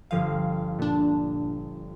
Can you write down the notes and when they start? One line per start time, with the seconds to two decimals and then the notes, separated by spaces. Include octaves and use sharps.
0.11 G1 F3 F5 D#7
0.79 A#2 D4